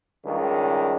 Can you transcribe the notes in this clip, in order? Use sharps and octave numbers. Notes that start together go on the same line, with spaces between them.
C#2 G2 D#3